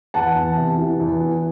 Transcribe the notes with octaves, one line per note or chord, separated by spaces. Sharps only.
E2 F#5 A5
E2
C3
E3
E2
E3